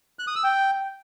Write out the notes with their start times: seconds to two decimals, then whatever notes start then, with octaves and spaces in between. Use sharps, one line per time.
0.19 F#6
0.27 D#6
0.36 E6
0.44 G5